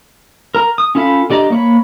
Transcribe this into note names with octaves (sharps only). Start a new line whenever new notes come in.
A#4 A#5
D#6
C#4 F4 A4 F5 B5
D3 G4 D5 D#5 A#5
A#3 C#5 B5